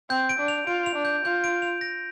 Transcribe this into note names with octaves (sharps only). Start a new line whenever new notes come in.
C4 G6
D7
D4
F7
F4 D7
F7
D4
G6
F4 G6
D7
F7
A#6